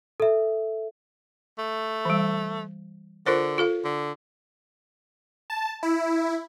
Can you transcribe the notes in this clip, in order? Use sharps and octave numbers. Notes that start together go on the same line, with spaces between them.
A4 E5
A3
E3 G3
D3 F4 A#4 C5
F4 A4 F5
D3
A5
E4